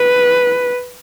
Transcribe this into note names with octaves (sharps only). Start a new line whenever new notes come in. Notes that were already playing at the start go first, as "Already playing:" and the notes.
Already playing: B4